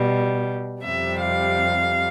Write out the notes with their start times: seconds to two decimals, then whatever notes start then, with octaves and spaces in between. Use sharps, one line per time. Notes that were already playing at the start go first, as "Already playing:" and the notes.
Already playing: B2 G3
0.83 F2 C3 G3 E5
1.21 F5